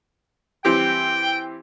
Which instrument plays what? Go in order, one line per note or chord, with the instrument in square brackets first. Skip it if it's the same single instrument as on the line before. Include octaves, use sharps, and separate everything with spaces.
[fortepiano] E3 C4 G4 [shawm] G5